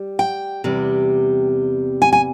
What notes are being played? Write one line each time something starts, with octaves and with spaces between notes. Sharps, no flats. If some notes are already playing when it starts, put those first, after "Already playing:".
Already playing: G3
G5
E2 C3 G3
G#5
G#5